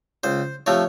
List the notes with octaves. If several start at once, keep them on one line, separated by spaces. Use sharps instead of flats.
C#2 C5
C3 F3 A3 C#5